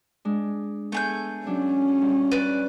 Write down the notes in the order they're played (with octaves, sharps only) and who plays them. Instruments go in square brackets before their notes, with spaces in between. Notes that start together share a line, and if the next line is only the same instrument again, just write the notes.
[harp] G#3 D4
[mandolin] A3 G#4 G6 [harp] B3
[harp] F#3 D4 [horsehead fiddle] C#4
[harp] G2
[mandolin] B4 D5